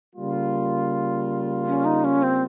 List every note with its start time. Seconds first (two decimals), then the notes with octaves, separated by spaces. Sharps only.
0.15 C#3 G3 A#3 F4
1.66 C#4
1.85 D#4
2.04 C#4
2.23 C4